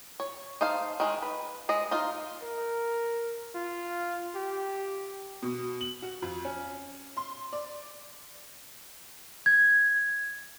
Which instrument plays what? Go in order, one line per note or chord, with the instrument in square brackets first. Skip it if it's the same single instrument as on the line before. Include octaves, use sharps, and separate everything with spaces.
[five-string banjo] C#5
D#4 A4 C5 F5
D#3 G#3
B4
G#3 D#5
D#4 F4
[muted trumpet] A#4
F4
G4
[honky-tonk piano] B2
F#7
F#4
F2
C#4
C6
D5
[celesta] G#6